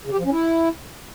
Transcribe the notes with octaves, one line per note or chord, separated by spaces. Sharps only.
C#3
G4
F3
C#4
E4